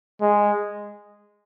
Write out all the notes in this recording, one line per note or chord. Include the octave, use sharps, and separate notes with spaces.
G#3